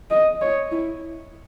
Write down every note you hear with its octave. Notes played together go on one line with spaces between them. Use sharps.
D#5
C#5
E4